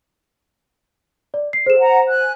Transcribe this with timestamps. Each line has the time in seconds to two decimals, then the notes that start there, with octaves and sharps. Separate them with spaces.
1.34 D5
1.53 C7
1.66 G#4 A4 C5 E7
1.79 F#5 A#5
2.10 G#5 F#6